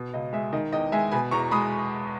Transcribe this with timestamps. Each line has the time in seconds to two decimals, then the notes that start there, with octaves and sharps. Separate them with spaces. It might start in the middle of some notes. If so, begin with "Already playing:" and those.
Already playing: B2
0.14 C#2 D#5
0.33 G#3 E5
0.53 D#3 D#5
0.72 E2 D#5 G5
0.92 G#3 E5 G#5
1.12 B2 G#5 B5
1.31 E2 A#5 C#6
1.51 G#3 B5 D#6